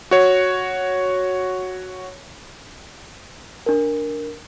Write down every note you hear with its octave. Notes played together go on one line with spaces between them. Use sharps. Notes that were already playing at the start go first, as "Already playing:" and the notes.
F#4 C#5
D4 A#4